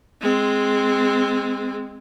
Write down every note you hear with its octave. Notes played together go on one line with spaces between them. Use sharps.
G#3 C4